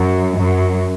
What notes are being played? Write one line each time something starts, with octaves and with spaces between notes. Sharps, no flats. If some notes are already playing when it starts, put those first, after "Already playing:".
Already playing: F#2
F#2